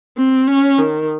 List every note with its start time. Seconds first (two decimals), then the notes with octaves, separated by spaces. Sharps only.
0.17 C4
0.48 C#4
0.78 D#3